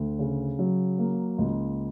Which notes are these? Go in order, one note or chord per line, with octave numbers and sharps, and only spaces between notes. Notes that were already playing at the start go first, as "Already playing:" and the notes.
Already playing: D2
C#3
F#3
A#3
C#2